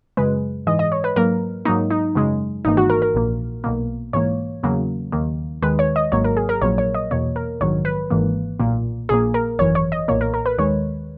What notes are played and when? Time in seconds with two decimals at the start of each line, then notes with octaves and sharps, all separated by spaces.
0.17 F#2 C#3 G#3 B4
0.66 G#2 E3 G#3 D#5
0.79 D#5
0.92 C#5
1.04 B4
1.16 G#2 F#3 A#3 A#4
1.65 G#2 F#3 A#3 D#4
1.91 D#4
2.15 F#2 C#3 G#3
2.65 G#1 G#2 E3 A#3 D#4
2.77 F#4
2.90 A#4
3.02 A#4
3.15 A#1 A#2 A#3
3.64 B1 B2 A#3
4.13 G#2 E3 A#3 C#5
4.63 E2 C#3 F#3 A#3
5.12 D#2 D#3 A#3
5.62 D#2 D#3 G#3 B4
5.79 C#5
5.96 D#5
6.12 G#1 G#2 F#3 A#3 C#5
6.24 A#4
6.37 G#4
6.49 A#4
6.62 A#1 A#2 F#3 A#3 C#5
6.78 C#5
6.95 D#5
7.11 E2 B2 A#3 C#5
7.36 A#4
7.61 A#1 G#2 D#3 F#3 C#5
7.85 B4
8.10 G#1 G#2 E3 A#3
8.60 B1 A#2 A#3
9.09 A#1 A#2 A#3 G#4
9.34 A#4
9.59 G#1 F#2 E3 C#5
9.75 C#5
9.92 D#5
10.08 B1 A#2 A#3 C#5
10.21 A#4
10.34 A#4
10.46 B4
10.58 D#2 D#3 G#3 C#5